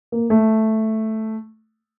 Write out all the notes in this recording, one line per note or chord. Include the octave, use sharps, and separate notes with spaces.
A#3
A3